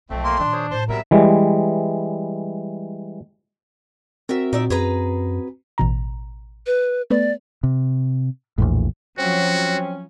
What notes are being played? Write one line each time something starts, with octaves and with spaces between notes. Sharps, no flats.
B1 F2 F#3 A3 C4
A#3 C6
A#2 D#3 D4
G#4 C5 C#5
A2 C3 C5 A5 C6
C3 F#3 G3 B3 A#4 E5
E3 G3 G#3
C4 F#4 A#4 E5
A#2 D#4 D5 E5
F#2 G#4 B4 A#5
A1 B2 A#5
B4
A3 B3 B4 D5
C3
A#1 E2 A2
F3 F#3 C4 C#4 F#4